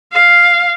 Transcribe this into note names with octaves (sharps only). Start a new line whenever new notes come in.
F5